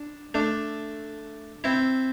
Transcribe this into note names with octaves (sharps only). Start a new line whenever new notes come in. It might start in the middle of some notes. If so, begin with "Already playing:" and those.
Already playing: D4
A3 D4
C4 E4